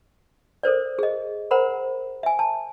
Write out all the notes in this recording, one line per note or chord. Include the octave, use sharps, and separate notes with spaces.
A4 A#4 C5 D5
G#4 D#5
A#4 C5 F#5 A#5 B5
E5 G#5
A5